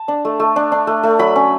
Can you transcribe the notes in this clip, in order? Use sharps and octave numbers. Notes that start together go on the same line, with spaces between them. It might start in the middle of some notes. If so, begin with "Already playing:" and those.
Already playing: A5
D4
A3
A3
D4
D4
A3
A3
F#3 B5
C#4